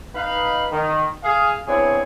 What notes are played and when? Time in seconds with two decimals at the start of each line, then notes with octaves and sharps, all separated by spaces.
0.15 D#4 B4 F5
0.72 D#3
1.23 G#4 F5
1.67 B3 C4 D4 E4 G#4 C#5